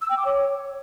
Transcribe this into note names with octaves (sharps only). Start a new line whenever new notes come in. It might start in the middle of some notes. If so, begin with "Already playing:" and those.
E6
G5
D6
C#5